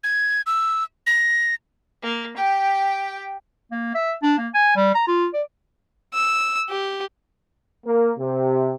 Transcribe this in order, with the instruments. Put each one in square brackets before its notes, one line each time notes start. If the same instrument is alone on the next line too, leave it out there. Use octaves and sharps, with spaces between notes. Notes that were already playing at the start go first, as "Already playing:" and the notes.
[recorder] G#6
E6
A#6
[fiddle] A#3
G4 G5
[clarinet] A#3
E5
D4
A#3
G#5
G3
A#5
F4
D5
[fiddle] E6
G4
[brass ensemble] A#3
C3